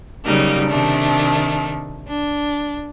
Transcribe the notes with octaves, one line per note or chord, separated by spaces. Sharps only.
C#3 F#3 G3 A#3 D#4
C3 D#3 A3 D4
D4